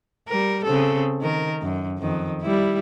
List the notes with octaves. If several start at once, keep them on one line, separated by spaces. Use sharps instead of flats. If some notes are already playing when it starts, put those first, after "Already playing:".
G3 A#4
C#3 C4 A4
D#3 A#4
F#2
F2 D#3
G3 E4